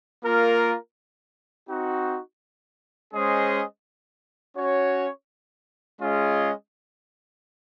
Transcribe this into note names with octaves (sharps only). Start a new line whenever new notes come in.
A#3 F4 A#4
C4 D#4 F#4
G#3 C#4 G#4 C5 D#5
C#4 F#4 C#5
G#3 C#4 F4 G#4 D#5